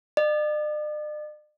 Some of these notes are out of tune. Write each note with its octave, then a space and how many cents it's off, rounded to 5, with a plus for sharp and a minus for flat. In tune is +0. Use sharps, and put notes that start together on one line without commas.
D5 +45